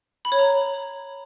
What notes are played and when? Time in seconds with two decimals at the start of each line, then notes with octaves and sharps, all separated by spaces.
0.25 B5
0.32 C#5
0.39 A#5